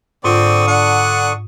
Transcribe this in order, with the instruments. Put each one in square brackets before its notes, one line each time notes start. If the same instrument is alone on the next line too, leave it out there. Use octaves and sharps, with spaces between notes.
[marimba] G#2 F4 [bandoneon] D3 C#6 D#6 [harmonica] C4 D5
[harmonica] D4 F#5